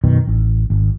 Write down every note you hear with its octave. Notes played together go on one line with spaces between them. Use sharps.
F#2 B2 D#3
A1
G#1